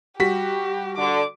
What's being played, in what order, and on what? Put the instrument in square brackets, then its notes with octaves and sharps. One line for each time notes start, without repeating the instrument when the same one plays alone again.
[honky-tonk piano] G3 [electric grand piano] F#4 B6 [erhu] G4
[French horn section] D3 [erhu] D6